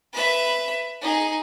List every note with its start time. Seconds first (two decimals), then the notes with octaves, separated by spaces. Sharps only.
0.13 B4 E5
1.01 D#4 G#4